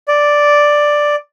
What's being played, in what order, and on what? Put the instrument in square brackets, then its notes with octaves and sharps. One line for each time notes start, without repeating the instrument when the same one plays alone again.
[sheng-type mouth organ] D5